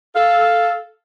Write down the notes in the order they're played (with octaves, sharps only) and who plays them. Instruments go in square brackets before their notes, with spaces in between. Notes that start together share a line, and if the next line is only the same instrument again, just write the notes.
[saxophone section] A4 F5